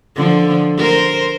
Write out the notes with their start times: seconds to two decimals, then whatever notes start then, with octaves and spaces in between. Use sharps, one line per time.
0.16 D3 F3
0.77 A#4 C5